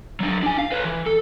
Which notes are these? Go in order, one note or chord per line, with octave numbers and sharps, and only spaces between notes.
F#3 D4
D4 G#5
F5
B4 C#5
E3
A4